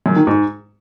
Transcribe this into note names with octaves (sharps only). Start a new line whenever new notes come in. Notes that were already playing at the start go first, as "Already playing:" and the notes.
F#2
D#3
G#2